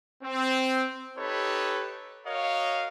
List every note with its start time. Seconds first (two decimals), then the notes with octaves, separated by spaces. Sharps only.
0.24 C4
1.17 D#4 G4 A4 B4 C#5 B5
2.25 F#4 A#4 C#5 D#5 F5